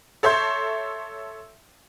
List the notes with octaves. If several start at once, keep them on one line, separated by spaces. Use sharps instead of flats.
A4 C#5 E5 C6 G6